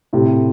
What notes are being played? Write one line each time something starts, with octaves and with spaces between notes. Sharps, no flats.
A2 C3